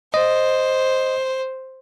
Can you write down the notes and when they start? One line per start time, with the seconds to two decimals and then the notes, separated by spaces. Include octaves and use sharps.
0.14 C5 D#5